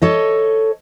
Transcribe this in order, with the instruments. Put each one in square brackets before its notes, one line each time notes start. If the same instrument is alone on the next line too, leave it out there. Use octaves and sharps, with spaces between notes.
[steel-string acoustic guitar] A4 C#5 D#5